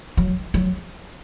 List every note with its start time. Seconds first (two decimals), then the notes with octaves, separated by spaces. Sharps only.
0.17 F#3
0.54 F#3